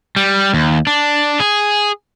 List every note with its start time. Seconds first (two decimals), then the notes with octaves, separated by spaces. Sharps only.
0.16 G3
0.54 D#2
0.87 D4
1.40 G#4